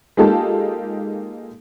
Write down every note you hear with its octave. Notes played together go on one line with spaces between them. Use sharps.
G#3 A#3 D#4 F4 G4 A4